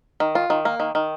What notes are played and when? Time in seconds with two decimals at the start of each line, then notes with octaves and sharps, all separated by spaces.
0.20 D#3
0.35 F4
0.50 D#3
0.65 A#3
0.80 D#3
0.95 D#3